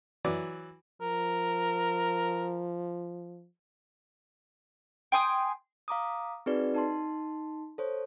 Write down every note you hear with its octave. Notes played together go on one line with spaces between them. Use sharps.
E3 F#3 D5 D6
F3 A#4
G5 G#5 C6 D#6
F5 A#5 D6 D#6
C4 D#4 F#4 G#4 B4 D5
D#4 A5 C6
A4 C5 C#5